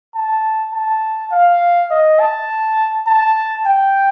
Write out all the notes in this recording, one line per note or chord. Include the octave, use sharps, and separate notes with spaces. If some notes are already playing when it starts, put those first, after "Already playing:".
A5
A5
F5
D#5
A5
A5
G5